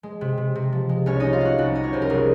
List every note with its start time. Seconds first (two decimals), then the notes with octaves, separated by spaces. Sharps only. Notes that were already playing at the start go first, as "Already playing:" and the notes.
0.03 G#3
0.21 C3
0.38 C3
0.55 C3
0.72 F3
0.89 G#3
1.06 C2 C#4 C#5
1.20 C#4 D#4 D#5
1.33 F4 F5
1.41 C#4 F#4
1.58 C2 F#4
1.75 C#4 D#5
1.84 C#5
1.93 C2 C5
2.02 A#4
2.10 F1 G#4